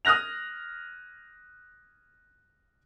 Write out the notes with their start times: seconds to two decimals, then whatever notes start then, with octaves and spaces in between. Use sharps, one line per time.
0.05 D#6 F6 F#6 A#6 F7